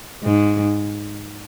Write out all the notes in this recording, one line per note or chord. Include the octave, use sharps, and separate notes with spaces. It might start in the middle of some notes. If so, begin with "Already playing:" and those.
G#2